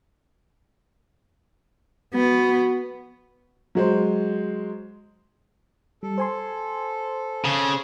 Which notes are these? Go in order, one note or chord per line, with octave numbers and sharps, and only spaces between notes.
B3 F#4
F#3 G#3 C5
G3 A4
C5 G#5 C6
C#3 G#4